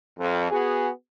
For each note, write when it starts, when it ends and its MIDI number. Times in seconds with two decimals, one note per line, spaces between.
0.19 0.49 41
0.51 0.89 59
0.51 0.89 66
0.51 0.89 68